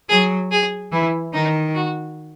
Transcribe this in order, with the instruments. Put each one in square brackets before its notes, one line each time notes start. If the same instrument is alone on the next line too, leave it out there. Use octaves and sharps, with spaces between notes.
[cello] F#3 [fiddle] G#4
[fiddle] G#4
[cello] E3 [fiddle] E4
[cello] D#3 [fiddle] D#4
[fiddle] F#4